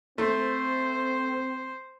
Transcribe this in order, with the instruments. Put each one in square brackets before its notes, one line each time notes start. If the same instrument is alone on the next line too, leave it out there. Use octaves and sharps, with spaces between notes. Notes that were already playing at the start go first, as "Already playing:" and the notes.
[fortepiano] A3 [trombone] C4 [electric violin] C5